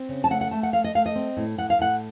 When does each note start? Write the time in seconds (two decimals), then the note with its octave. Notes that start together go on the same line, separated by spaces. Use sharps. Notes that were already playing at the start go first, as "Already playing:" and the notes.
Already playing: C4
0.09 C#3
0.24 A5
0.30 A3 F#5
0.41 F#5
0.51 A3 A5
0.63 F#5
0.73 A3 F5
0.84 D#5
0.95 A3 F5
1.06 D#5
1.15 C4
1.37 A2
1.58 A2 F#5
1.70 F5
1.79 A2 F#5